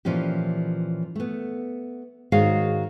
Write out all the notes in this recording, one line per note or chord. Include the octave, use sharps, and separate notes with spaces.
A#2 E3 F3 C#4 G4
A3 B3
G#2 D#3 F#4 G#4 C#5 F5